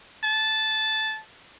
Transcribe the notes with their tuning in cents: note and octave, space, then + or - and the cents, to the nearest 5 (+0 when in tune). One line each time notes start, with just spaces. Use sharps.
A5 -15